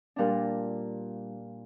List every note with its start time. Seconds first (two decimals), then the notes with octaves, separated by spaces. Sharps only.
0.16 A#2 G3 D4 F4 A#4